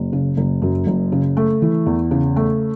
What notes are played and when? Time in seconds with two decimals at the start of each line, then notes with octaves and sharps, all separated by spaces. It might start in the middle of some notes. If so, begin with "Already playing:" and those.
Already playing: F#1
0.13 C#3
0.37 F#1
0.62 F#2
0.87 F#1
1.12 C#3
1.37 A3
1.62 E3
1.86 E2
2.11 C#3
2.36 A3